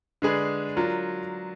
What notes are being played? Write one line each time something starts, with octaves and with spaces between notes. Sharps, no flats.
D3 G#3 D4 G#4 B4
F#3 D4 F4 A#4